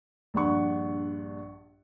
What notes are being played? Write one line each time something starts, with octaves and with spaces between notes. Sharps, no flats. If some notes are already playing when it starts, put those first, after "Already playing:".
A#1 G2 D4 F#5 C#6